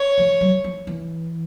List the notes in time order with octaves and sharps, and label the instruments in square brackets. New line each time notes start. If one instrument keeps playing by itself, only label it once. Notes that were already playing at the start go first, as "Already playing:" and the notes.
Already playing: [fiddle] C#5
[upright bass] F3
F#3
F3
E3